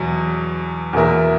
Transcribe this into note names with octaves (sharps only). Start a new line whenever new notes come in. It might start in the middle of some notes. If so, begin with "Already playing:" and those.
Already playing: E2 B2 F#3
E2 B2 A#3 E4 A#4